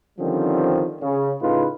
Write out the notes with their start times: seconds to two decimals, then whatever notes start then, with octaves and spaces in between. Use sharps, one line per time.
0.19 D3 D#3 F3 G3 C4 C#4
1.01 C#3
1.41 A2 C#3 D#4 F4 B4